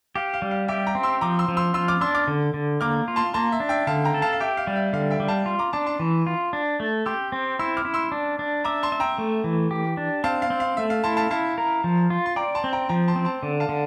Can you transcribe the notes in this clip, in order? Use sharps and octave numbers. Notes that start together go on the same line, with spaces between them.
G4 F5
F5
G3
F5
G4 E5 G5
G5 A#5
C4
C6 E6
F3 A#5 D6
C6 E6
F3
C6 E6
F4 C6 E6
D6 F6
D4 C6 E6
D6 F6
D3
D3
A#3 D6 F6
F4
A5 C6
A#3 A5 C6
E5
D4
E5 G5
D3 F5 A5
G5 A#5
A4
F5 A5
F5
G4 E5 G5
F5
G3
E5
D3 F5
E5 G5
G3
F5 A5
F4
A#5 D6
D4 A5 C6
A5 C6
E3
F4
D4
A3
G4 C6 E6
C4
E4 C6 E6
D6 F6
E4
C6 E6
D4
D4
E5 A#5 D6
A5 C6
E5
G5 A#5
A3
E3
G4
D4
C4 F5 A5
F5
C4
F5
A3 E5
F5
E4 A5 C6
F5 A5
E4 F5 A5
A#4
F3
F4
C6
D5 G5 A#5
A5 C6
C4
G5 A#5
F3 G5 A#5
A5 C6
C4
A5 C6
D3
F5 A5
D3